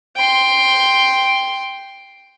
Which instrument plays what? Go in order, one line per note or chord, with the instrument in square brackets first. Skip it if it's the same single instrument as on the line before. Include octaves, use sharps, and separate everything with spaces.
[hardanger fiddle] G5 C6